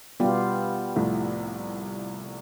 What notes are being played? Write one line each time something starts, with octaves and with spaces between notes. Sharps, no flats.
B2 G3 B3 F4 G4
C2 A2 F3